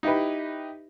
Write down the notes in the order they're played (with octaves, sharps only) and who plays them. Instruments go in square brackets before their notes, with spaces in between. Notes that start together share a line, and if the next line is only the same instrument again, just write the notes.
[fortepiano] D#4 E4 G4 B4